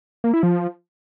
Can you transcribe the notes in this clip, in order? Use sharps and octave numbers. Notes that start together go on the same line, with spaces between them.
A#3
E4
F3